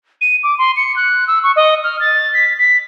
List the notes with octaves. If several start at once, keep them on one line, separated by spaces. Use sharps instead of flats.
D#7
D6
C6
C#7
F#6
E6
C#6
D#5
F6
A6
B6
B6